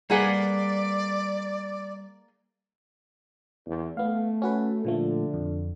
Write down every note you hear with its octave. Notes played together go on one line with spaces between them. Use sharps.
G3 A#3 G#4 B4 C5 D5 F#5
E2
A3 B3 F5
C#4 F#4 B4
A#2 D3 F3 A3
F2